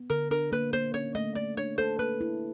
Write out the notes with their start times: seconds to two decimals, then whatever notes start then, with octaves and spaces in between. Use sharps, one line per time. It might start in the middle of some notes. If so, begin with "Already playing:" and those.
Already playing: B3
0.10 D3 A#4
0.31 D4 A#4
0.52 A#3 B4
0.73 A#3 C5
0.94 C#4 C#5
1.15 A3 D#5
1.35 A3 D5
1.57 D4 C#5
1.78 A4 C5
1.99 A#3 B4
2.21 E4